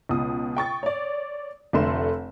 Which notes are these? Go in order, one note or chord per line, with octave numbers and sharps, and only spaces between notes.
C#2 B2 D#6
G5 C#6 A6
C#5 D5
F1 D3 A3 C6 E7